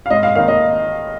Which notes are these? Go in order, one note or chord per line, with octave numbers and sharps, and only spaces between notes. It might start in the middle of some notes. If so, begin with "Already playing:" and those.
F5
G#2 D#5
F5
D#3 A#3 D#4 F5
D#5